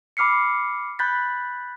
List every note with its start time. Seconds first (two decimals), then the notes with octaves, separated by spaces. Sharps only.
0.17 B5 D6 F6 C7 C#7
0.99 B5 F#6 G6 A6 B6